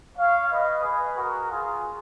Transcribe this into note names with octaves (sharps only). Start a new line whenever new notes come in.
C#5 F5
B4 D#5
G#4 B4
F#4 A#4
F4 G#4